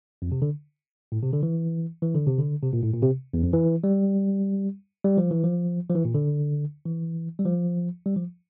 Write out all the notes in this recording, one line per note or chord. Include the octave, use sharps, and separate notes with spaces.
F2
C3
D3
A2
C3
D3
E3
E3
D3
C3
D3
C3
A#2
A2
A#2
C3
E2
F2
E3
G3
G3
F3
E3
F3
F3
E3
A#2
D3
E3
G3
F3
G3
F3